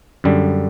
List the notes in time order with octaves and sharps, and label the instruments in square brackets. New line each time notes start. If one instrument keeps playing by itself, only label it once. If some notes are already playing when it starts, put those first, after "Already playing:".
[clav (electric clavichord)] F#2 D3 G3